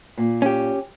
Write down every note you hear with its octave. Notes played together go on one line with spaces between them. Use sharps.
A#2
C#4 G4